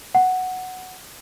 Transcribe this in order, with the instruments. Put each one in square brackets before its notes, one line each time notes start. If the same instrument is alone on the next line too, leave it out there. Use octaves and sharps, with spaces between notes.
[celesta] F#5